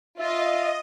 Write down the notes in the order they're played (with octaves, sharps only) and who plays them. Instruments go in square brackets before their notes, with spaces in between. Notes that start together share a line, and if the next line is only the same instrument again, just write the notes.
[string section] F4 [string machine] D#5 [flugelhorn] E5